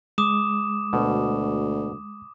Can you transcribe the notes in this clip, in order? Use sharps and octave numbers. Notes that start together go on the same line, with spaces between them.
G#3 D6 D#6 E7
D2 B2